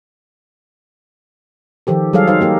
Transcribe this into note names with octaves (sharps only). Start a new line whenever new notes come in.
D#3 F3 G4 A4
F#3 G3 G#4 A4 F5
D#4 C5 F5
A#3 G4 A#4